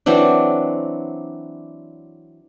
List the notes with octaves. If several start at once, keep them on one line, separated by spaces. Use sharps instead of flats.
E3 F#3 C4 D4